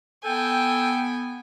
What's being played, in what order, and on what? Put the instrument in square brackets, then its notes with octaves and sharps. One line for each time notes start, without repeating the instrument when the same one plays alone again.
[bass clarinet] B3 [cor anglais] A4 [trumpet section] G5 [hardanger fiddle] G#5